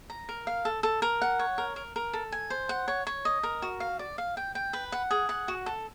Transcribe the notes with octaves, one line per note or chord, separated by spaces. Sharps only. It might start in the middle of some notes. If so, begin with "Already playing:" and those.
A#5
A#4
F5
A4
A4
A#4
F#5
C#5
A#4
A#4
A#4
A4
G#5
C5
F#5
C#5
C#5
D#5
A#4
F#4
F5
D5
F5
G5
G5
B4
F#5
G#4
F#5
F#4
A4